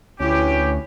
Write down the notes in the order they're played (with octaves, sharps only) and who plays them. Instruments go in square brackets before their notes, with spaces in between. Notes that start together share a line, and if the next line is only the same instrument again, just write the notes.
[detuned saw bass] D2 [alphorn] C#4 [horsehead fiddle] E4 B4 [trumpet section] G4